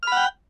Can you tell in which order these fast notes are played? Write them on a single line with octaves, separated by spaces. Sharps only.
F6 B5 F#5 G5